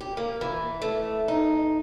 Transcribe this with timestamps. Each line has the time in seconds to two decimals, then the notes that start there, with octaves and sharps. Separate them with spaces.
0.01 G4
0.17 A#3
0.41 E3
0.82 A3
1.28 D#4